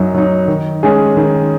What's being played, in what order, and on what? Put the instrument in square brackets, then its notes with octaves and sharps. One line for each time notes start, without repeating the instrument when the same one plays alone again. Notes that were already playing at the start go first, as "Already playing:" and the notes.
Already playing: [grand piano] F#2 F#3 D#4
F#3 D#4
D#3
G#3 C#4 G#4
D#3